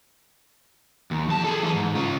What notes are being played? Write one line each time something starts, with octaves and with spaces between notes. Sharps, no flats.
D#2
F2 A5
G#4 A4
E3 G#4
G#2
C#3 F4